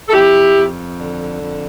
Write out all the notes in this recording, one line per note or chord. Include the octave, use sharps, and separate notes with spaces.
A4
F2 E4 G4
F2
D3
F2